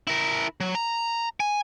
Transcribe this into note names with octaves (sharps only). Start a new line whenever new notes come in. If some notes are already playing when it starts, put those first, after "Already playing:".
E4 A#4
F#3
A#5
G#5